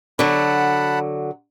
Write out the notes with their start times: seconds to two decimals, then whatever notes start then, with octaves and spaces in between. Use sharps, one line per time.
0.19 D3 F#3 F#5 A5 B5